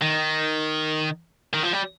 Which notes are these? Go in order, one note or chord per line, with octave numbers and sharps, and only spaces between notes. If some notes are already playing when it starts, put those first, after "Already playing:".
D#3
D#3
F3
G3